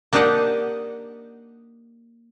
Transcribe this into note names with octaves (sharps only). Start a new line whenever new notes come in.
A#3 D4 D#4 G4 D#5 F#5